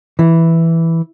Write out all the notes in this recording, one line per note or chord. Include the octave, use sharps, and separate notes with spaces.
E3